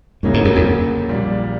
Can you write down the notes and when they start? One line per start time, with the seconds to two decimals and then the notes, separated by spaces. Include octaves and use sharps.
0.23 D2 G#2 C#3 F#3 A#3 C#4
0.34 G#2
0.45 F#2
0.56 F2
1.09 A#1 A#2 G3